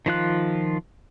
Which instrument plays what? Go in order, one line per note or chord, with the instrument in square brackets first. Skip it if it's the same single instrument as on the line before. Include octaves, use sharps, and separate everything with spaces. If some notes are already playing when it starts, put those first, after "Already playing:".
[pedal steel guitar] D#3 F3 F4 F#6